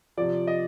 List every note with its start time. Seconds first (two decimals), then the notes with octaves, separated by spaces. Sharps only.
0.17 C3 F3 D5
0.47 D#5